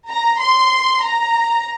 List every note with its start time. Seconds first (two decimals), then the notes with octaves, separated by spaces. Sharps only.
0.10 A#5
0.40 C6
1.03 A#5